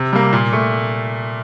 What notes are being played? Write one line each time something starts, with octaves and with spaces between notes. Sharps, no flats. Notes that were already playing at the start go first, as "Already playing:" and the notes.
Already playing: C3
G3 A#3
A#2
A3